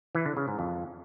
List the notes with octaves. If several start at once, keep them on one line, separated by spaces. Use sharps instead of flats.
E3
D3
C#3
G#2
F2